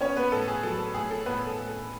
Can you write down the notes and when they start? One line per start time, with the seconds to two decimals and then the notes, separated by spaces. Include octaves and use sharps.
0.01 B3 C#4 C#5
0.17 B3 B4
0.32 A2 A4
0.48 G#4
0.63 F#3 A4
0.79 A4
0.94 A2 G#4
1.11 A4
1.26 A2 B3 B4
1.47 A4
1.58 A2
1.68 A4